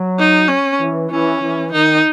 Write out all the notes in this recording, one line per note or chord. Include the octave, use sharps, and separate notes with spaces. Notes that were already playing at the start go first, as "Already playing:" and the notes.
Already playing: F#3
D#4
C#4
E3
E3 C#4
E3
D#3 D#4